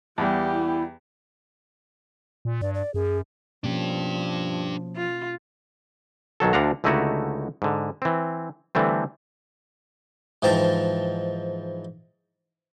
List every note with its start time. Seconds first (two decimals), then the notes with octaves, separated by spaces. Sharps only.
0.18 E2 G3 B3 G4
0.52 E4
2.45 A#2
2.62 G2 D5
2.74 D5
2.94 F#2 G#4
3.64 B2 F3 A#3 C#4 D4 G4
4.96 F4
6.40 B1 D#3 F#3 A4
6.53 D2 D3 D4 F5 F#5 A#5
6.84 C#2 D3 A3 D#4 E4 F#4
7.62 G#2 D3
8.02 E3 C4
8.75 D3 E3 G3 A3 C4
10.42 G#2 E3 F3 G5 A5 A#5